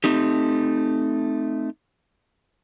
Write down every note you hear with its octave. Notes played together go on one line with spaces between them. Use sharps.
A3 C4 D#4 G4